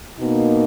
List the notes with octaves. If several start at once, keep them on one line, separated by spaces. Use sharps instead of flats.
B2 A#3 D#4